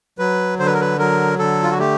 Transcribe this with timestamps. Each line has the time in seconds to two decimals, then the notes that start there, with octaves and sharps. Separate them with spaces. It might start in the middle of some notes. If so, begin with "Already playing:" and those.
0.19 F#3 B4
0.59 D3 C5
0.66 B4
0.74 A#4
0.81 B4
0.99 F#3 A#4
1.39 D3 A4
1.63 F4
1.71 F#4
1.79 A3 G4